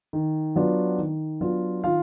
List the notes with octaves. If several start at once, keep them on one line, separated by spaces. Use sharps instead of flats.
D#3
F#3 B3 D4 F4
D#3
F#3 B3 D4 F4
D#3 F4 F5